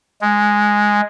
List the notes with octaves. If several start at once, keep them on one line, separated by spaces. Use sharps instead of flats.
G#3